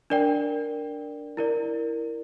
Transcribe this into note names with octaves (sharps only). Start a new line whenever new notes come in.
D4 A#4 D5 G5
E4 A#4 D5